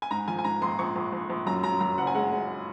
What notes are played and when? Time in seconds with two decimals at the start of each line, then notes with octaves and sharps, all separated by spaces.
0.02 G#5
0.11 G#2 A#5
0.28 F3 G#5
0.39 G#5
0.44 G#2 A#5
0.62 A#1 C6
0.79 A#1 C#6
0.95 A#1
1.12 A#1
1.30 A#1
1.46 F#2 A#5
1.63 F#2 A#5
1.80 F#2 A#5
1.98 F#1 F#5
2.07 G#5
2.14 G#3 F#5
2.31 G#3